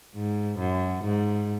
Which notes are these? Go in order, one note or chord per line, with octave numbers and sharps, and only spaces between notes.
G#2
F#2
G#2